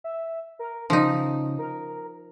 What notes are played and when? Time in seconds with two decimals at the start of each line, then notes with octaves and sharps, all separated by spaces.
0.04 E5
0.59 A#4
0.90 C#3 F3 D#4
1.59 A#4